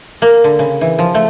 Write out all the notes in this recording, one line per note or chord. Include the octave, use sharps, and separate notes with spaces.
A#3
D3
C#3
E3
F3
A3